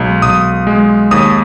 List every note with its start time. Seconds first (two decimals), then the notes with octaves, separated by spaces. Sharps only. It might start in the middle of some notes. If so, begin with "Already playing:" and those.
Already playing: B1 G#3
0.22 B1 D#6
0.67 G#3
1.11 D#2 D#6